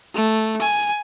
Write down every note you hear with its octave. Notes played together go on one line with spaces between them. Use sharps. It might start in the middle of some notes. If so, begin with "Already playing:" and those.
A3
G#5